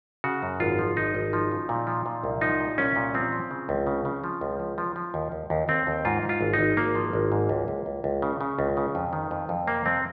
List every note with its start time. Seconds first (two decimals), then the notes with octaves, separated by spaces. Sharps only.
0.24 C#3 F#4
0.43 F#2
0.60 G#1 F4
0.79 F3
0.96 G#1 D#4
1.15 G#1
1.33 F3
1.51 C#3
1.69 A#2
1.87 F3
2.06 A#2
2.24 C2
2.41 F3 D#4
2.60 A#2
2.78 C2 C#4
2.96 A#2
3.14 F3 C4
3.32 F3
3.51 C#3
3.69 C#2
3.87 C#3
4.05 C#3
4.24 F3
4.41 C#2
4.59 F3
4.78 F3
4.96 F3
5.14 D#2
5.32 D#2
5.50 D#2
5.68 D#2 C4
5.87 D#2
6.05 G#2 F4
6.23 G#2
6.29 F4
6.41 G#1
6.54 D#4
6.59 G#1
6.77 G#1 A#3
6.95 F3
7.13 G#1
7.32 G#2
7.49 C#2
7.68 C#2
7.86 C#2
8.04 C#2
8.22 C#3
8.41 C#3
8.59 C#2
8.77 C#3
8.95 F2
9.13 D#3
9.31 F2
9.49 F2
9.68 C3 A#3
9.86 F2 C4